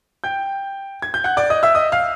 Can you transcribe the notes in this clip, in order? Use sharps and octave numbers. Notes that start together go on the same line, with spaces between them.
G5 G6
G#6
G6
F#5 F#6
D5 D6
D#5 D#6
E5 E6
D#5 D#6
F5 F6